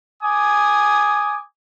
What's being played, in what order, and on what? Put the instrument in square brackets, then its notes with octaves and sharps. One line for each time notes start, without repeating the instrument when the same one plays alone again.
[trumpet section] G#5 D6 D#6